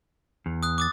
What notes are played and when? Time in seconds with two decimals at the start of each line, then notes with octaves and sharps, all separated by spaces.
0.46 E2
0.63 D#6 F#6
0.78 D6 D#6 A6